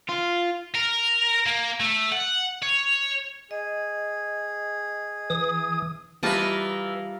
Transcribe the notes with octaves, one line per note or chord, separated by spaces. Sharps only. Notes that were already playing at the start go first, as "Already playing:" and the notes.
F4
A#4
A#3
A3
F#5
C#5
G#4 D#5
E3 D#6
E3 G3 F4 A#4 B4 D#5 E5 A5